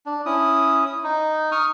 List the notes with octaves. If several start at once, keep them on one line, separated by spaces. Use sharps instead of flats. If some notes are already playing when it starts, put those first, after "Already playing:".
D4
C#4 E4 D#6
D#6
D#4
C#6 D#6 F6